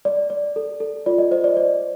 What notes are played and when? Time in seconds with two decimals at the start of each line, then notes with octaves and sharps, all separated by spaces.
0.05 D5
0.30 D5
0.56 A4
0.80 A4
1.06 F4 D5
1.18 D#5
1.31 C5 D#5
1.44 D5
1.57 D5